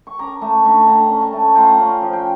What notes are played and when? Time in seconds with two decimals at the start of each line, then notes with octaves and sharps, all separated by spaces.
0.07 C#6
0.19 C#4 A#5 D6
0.41 A3 A5 C#6
0.64 D3 A5 C#6
0.87 D3 G5 A#5
1.10 C#4
1.21 A5 C#6
1.33 A3
1.55 F4 G5 A#5
1.78 C#4
2.02 F3
2.13 G5